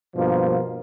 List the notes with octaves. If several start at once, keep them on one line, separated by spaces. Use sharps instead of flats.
G2 B2 F3 A#3